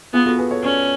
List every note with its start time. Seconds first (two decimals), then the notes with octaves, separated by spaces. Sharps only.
0.13 B3 F4 G#4
0.26 F#4 A4
0.38 G#4 B4
0.51 A4 C#5
0.63 C#4 B4 D5